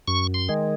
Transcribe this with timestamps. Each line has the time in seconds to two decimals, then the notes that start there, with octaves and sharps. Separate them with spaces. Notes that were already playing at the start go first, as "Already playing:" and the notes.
0.08 F#2 C#6
0.34 C6
0.49 D#3 G#3